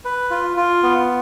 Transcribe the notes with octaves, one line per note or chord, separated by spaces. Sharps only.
B4
F4
F4
B3